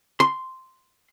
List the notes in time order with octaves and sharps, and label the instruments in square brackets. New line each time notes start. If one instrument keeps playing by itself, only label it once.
[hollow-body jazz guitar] C6